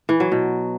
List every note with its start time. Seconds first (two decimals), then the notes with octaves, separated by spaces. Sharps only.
0.09 E3
0.20 F#3
0.32 B2